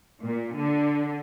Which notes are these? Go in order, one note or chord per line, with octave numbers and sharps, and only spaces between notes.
A#2
D3